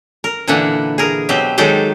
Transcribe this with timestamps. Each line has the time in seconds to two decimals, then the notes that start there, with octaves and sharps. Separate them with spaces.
0.24 A#4
0.48 A#2 D3 E3 D4 E5 F#5
0.98 G#4 A#4
1.29 B2 F#3 C4 G4 E5
1.58 D#3 F#3 G#3 G4 A4 C5